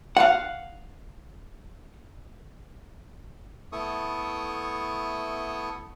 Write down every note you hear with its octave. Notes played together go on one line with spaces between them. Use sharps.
F5 F#5
A3 B3 E4 A4 C#6 D#6